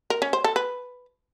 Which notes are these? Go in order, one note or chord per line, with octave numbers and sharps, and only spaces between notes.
A#4
C#4
C5
A4
B4